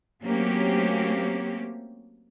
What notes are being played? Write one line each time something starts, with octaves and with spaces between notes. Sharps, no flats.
F#3 A3 A#3 C4 C#4 G4